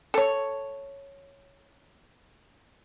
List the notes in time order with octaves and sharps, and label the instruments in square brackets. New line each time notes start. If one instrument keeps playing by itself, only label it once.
[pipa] A4 C#5